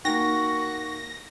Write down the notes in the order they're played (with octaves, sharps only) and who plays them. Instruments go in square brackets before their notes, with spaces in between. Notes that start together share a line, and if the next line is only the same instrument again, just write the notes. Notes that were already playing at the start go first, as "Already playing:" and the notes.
[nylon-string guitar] A#3 A#4 G5 [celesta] D#4 [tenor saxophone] F#4 [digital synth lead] A#6